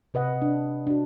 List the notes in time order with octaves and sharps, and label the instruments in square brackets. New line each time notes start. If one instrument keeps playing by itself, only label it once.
[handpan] C3 B4 D#5 F#5
D4
D4 F#4